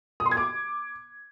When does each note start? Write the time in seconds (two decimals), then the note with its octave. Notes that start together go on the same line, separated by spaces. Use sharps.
0.20 D#6
0.26 C6
0.31 G#6
0.37 D6